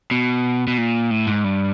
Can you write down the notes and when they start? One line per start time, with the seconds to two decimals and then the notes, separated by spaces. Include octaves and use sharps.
0.11 B2
0.67 B2
0.78 A#2
1.11 A2
1.27 G#2
1.44 G2